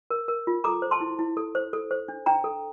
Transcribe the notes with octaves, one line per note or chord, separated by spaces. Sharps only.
A#4
A#4
F4
A4 A#5 D6
C5
A5 C6
E4
E4
A4
C5
A4
C5
D4
D4 G5 A#5
A4